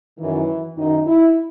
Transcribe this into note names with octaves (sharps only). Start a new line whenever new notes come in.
F#2 D#3 E3
F#2 D#3 D#4
E4